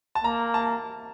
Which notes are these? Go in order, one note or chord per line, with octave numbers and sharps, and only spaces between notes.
A5
A#3 A#5
A5